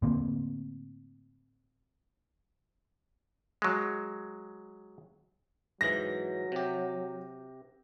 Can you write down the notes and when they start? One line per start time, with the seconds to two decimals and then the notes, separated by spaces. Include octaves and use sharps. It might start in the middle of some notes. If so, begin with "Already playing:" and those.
0.02 A2 D3 A#3 C4
3.62 F#3 G#3
5.81 G#2 E3 F#3 A#6
6.52 C3 G4